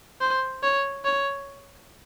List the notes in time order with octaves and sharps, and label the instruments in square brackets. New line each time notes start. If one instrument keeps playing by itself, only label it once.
[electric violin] C5
C#5
C#5